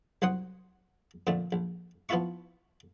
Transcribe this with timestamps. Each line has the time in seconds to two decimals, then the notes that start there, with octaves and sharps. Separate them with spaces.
0.22 C2 F#3 C5 F#5 D#6
1.27 F2 A#2 D3 A3
1.52 A#1
2.09 F3 B3 E4 F4 E5 C#6